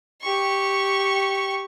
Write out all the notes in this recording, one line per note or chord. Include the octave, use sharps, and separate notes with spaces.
G4 C#6